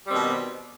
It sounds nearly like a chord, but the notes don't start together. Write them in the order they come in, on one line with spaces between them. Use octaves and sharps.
G3 D#3 C4 B2